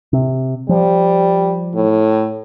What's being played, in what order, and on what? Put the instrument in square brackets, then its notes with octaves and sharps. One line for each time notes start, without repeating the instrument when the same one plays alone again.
[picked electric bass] C3
[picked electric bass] F3 [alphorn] G3
[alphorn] A2